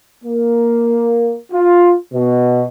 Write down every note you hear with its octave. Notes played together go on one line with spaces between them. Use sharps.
A#3
F4
B2